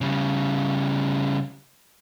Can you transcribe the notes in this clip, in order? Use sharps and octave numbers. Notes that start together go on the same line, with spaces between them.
C#3 G3